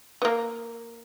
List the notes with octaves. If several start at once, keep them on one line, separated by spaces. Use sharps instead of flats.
B3
A#3